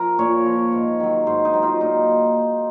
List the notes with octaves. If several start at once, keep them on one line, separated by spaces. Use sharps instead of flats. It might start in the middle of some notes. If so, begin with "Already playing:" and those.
Already playing: F3 A#4
A#2 C#5
F3
G#2
D#3 F#3
G#2 C5
D#4
D#3 F#3
F4
A#2 D#4